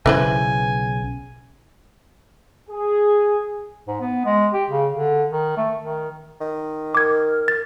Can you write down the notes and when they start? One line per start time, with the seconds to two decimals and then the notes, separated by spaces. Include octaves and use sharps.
0.06 B1 C#3 E3 B4 C5 G#5
2.69 G#4
3.88 G#2
4.01 B3
4.25 G#3
4.53 G4
4.70 C#3
4.92 D3
5.30 D#3
5.57 A3
5.80 D#3
6.40 D#3
6.95 A#4 D6 G#6
7.48 A6